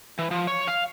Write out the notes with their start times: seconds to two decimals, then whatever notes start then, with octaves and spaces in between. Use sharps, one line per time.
0.19 E3
0.31 F3
0.47 C#5
0.68 F5